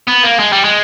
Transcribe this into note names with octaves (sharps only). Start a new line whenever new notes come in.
B3
A#3
G#3
G3
G#3